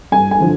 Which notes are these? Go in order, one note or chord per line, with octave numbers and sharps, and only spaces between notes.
G2 G#5
G#5
D3 F3